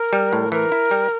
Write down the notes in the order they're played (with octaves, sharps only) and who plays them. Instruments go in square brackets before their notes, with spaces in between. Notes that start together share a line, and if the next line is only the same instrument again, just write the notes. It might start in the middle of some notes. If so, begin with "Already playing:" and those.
Already playing: [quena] A#4
[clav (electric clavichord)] G3
A2
[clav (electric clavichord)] E3 [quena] A#4
[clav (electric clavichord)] E4
G3